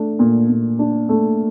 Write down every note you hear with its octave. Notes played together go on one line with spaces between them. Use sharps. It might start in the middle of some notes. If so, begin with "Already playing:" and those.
Already playing: A3 D4
A#2
A#2
D4
A3